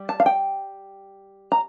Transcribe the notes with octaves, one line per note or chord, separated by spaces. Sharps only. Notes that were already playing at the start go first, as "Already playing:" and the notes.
Already playing: G3
A5
F5
G5
A#5